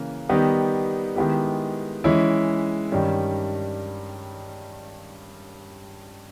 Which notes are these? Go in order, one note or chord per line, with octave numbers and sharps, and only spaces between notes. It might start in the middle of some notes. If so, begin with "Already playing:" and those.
Already playing: C#3 E3 A#3
D#3 G3 B3 D#4 G4
D#3 G#3 B3 E4 G4
E3 G#3 C#4 E4
G2 D#3 G3 C#4